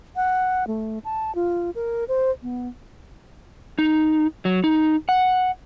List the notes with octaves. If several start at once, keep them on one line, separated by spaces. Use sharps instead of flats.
F#5
A3
A5
F4
A#4
C5
B3
D#4
F#3
D#4
F#5